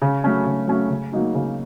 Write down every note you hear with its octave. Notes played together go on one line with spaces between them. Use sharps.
C#3
F#3 A3 C#4
C#3
F#3 A3 C#4
C#3
F#3 A#3 D#4 F#4
C#3